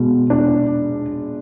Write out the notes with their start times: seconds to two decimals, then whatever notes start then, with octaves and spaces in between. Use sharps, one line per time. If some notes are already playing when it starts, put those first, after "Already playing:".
Already playing: B2 G#3
0.30 D4